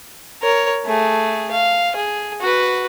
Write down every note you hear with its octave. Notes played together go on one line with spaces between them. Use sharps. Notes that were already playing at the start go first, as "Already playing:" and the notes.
A#4 C#5
A3 G#4
F5
G#4
F#4 B4